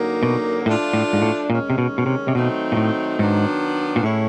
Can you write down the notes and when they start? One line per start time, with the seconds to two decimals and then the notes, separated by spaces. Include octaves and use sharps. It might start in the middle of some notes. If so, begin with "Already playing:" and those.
Already playing: F#2 D3 F#3 A#3 D#4
0.23 B2
0.66 A2 F3 A3 D4 F4
0.93 A2
1.13 G#2
1.22 A2
1.50 D#2 A#2 D#3 G#3 C#4
1.70 C3
1.78 B2
1.98 B2
2.06 C3
2.28 C3
2.35 B2 D#3 F#3 A3 C4 D#4
2.72 A#2
2.76 A2
3.19 G#2 D#3 F#3 B3 D4
3.96 A#2
4.03 A2 G#3 C#4 E4 A4 C#5